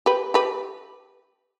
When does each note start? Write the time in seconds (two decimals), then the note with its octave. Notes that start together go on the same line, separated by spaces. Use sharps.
0.06 G4 B4
0.34 G4 B4